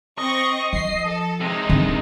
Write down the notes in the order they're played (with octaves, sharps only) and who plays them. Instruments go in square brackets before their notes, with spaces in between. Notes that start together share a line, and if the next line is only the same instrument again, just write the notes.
[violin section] C4 C#6 A#6 [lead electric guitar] D#5
[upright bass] F3 [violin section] C7
[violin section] A4
[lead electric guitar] C3 G#3 [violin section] D#4
[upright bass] D3 C4